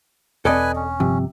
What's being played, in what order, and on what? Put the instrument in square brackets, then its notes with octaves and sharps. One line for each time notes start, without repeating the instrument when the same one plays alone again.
[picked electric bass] E1 C4 [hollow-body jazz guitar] A4 D5 D#5 [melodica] B4 G#5
[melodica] C#4
[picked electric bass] G1 G2 F3 [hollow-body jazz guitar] C3